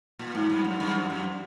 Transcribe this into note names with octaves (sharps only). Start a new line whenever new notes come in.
A#2
G#2
G2
F#2
G2
F#2
F#2